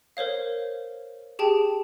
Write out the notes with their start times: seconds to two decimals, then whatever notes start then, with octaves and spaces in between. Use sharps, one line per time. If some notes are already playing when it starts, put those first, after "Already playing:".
0.17 A#4 C5 C#5 F5
1.39 G4 G#4 G5 A5